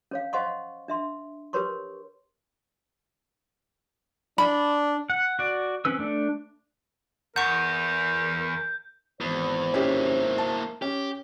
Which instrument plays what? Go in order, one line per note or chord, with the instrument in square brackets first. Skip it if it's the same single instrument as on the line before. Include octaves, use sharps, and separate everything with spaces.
[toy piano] C#4 C#5 F5
C5 D#5 F5 F#5 C6 C#6
D4 E5 C6
G4 A#4 B4 C#5 C6 C#6
[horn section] D4 [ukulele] B5
[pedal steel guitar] F#5
F#4 D5
C4 C#4 B4 E6
A3 D4
[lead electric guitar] E2 [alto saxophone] A#4 [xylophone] F#5 C#6 [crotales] G6
[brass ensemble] G#1 C5 [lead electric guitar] E2
[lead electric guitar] A#3 E4 [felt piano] C#4 G4
[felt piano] A5
[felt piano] C#4 [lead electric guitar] G4